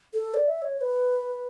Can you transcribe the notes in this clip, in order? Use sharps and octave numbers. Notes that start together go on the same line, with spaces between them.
A4
D5
E5
C#5
C#5
B4